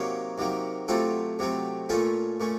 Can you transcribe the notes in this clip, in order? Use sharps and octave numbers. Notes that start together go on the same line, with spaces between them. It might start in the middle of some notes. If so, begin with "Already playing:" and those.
Already playing: C3 D#3 F#3 A#3 C#5 F5
C3 D#3 F#3 A#3
C3 F#3 A3 C4 F4 A4
C3 F#3 A3 C4
A#2 A3 C#4 F4 A4
A#2 A3 C#4